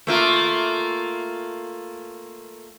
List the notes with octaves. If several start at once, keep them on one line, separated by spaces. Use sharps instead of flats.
A3 A#3 F4